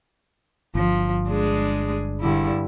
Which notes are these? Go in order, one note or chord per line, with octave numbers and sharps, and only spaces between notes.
G1 F3
G#3 D4 G#4
G2 D3 E4